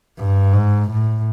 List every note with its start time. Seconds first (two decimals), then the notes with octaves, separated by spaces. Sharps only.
0.18 G2
0.53 G#2
0.90 A2